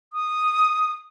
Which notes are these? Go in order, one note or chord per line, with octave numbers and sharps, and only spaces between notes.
D#6